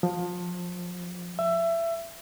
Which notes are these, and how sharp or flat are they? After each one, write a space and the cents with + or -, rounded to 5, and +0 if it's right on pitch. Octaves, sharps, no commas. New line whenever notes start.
F3 +25
E5 +20